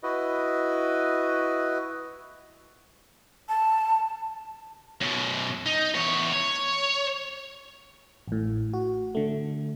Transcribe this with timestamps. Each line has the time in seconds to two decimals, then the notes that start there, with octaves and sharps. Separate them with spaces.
0.03 E4 F#4 B4 D#5
3.49 A5
5.02 F#2 B2
5.66 D#4
5.95 E2 C#5
6.33 C#5
8.28 A1 A2
8.73 F#4
9.15 D3 A3